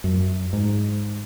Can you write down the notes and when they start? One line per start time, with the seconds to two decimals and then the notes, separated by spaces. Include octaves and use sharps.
0.04 F#2
0.53 G#2